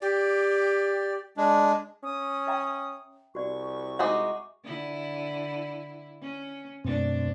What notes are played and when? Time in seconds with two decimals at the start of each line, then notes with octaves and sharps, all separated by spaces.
0.02 G4 D5
1.37 G#3 D4
2.04 C#4 D#6
2.47 E5 G5 A#5
3.35 C2 F#4 D5 C#6
3.99 G#3 D#4 F#4 E5 D6
4.65 D3 E4
6.22 C#4
6.84 F#2 B2 A3 C4 D4